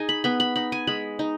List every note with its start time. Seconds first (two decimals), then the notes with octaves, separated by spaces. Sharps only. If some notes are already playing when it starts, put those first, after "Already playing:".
Already playing: D#4 G#4 G#5
0.09 B5
0.24 B3 B5
0.40 B5
0.56 D#4 B5
0.72 G#5
0.87 G#3 B5
1.19 D#4